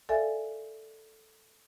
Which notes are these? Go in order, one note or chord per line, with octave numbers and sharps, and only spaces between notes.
A4 A#4 D5 E5 F5 G#5